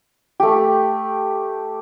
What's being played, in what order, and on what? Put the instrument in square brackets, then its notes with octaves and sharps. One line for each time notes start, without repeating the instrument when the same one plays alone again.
[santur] A3 G4